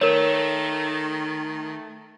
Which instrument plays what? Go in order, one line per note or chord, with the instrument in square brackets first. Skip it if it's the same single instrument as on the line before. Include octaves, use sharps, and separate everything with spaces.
[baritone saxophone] D#3 [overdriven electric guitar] A3 [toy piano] A#4 C#5